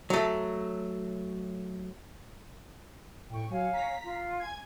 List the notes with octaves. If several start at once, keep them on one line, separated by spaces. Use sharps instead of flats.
F#3 A3
A2 G5 C#6
F#3 C#5 F5 G#5
A#5 B6
F4
G#5 G#6